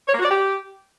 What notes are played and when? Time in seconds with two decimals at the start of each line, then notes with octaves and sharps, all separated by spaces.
0.07 C#5
0.13 A#3
0.18 F#4
0.24 D5
0.29 G4